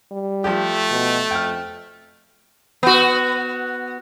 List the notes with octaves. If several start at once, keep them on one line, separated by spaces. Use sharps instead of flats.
G3
F3 A3 G4
B2
F2 G5 F6
B3 F#4